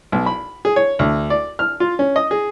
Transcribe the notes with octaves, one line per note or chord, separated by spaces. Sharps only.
B1
B5
G#4
C#5
D2
D5
F6
F4
C#4
D#5
G#4